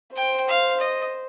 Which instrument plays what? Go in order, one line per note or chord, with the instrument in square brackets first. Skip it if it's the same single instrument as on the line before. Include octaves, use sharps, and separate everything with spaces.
[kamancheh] C5 [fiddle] G5
[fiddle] F5
D#5